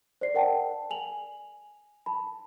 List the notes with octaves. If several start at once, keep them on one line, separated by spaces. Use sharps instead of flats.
C5 D5 C7
A#4 D5 F#5 G5 A5
G#5 F7 F#7
A5 B5